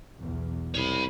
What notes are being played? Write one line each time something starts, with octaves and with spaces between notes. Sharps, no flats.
B1 E2
C2 C#5 B5